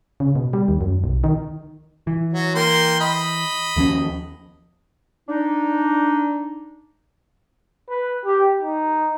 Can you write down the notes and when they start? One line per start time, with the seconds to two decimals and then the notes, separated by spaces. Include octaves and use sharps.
0.20 C#3
0.36 B2
0.53 G3
0.68 D#2
0.81 F#2
1.04 B1
1.24 D#3
2.07 E3
2.34 F#3
2.55 A#3 G5 C6
3.00 D#5 B5
3.76 D#2 F3 C#4
5.29 D4 D#4
7.90 B4
8.25 G4
8.62 D#4